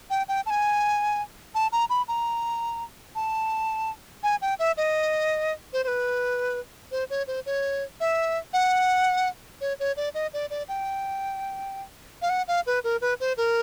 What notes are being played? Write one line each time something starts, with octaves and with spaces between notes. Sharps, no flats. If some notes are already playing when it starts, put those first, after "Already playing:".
G5
G5
A5
G#5
A5
A#5
B5
A#5
A5
G#5
G5
E5
D#5
C5
C5
B4
C5
C#5
C5
C#5
E5
F#5
C#5
C#5
D5
D#5
D5
D5
G5
F5
F#5
F5
B4
A#4
B4
C5
A#4